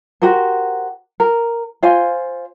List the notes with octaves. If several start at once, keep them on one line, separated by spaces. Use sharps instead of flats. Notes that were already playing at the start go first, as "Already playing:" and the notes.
F#4 G4 A#4 C5
A#4
F4 C5 F5 G#5